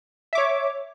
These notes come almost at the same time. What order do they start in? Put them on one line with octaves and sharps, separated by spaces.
E5 D6 C#5